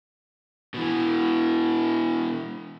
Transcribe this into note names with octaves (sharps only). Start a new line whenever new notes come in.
B2 E3